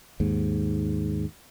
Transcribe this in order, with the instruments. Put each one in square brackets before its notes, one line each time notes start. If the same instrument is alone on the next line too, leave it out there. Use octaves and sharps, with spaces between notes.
[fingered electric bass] D#2 G#2